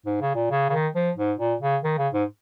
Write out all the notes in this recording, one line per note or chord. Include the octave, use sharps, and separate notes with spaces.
G#2
C#3
A#2
C#3
C#3
D#3
F3
G#2
A#2
C#3
D#3
C#3
G#2